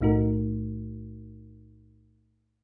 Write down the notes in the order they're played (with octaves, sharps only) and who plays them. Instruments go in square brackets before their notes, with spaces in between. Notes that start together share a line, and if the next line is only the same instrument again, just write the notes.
[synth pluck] B1 A2 A3 D#4 F#4 A#4